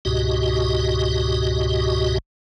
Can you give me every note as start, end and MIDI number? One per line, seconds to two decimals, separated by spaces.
0.05 2.18 37
0.05 2.18 44
0.05 2.18 47
0.05 2.18 66
0.05 2.18 67
0.05 2.18 75